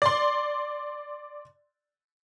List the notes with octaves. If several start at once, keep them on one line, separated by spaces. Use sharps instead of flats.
D5 C6